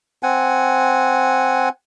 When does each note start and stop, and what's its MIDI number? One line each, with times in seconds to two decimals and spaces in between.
0.23 1.69 60
0.23 1.69 78
0.23 1.69 80